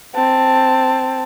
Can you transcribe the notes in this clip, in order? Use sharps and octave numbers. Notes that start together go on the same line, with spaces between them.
C4 A5